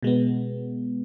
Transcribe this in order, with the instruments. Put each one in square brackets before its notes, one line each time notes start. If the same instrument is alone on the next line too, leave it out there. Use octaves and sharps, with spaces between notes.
[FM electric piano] B2 G#3 B3